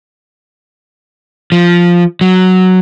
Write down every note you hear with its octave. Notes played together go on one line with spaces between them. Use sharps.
F3
F#3